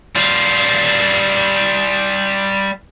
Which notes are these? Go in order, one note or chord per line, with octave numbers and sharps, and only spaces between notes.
G3 F4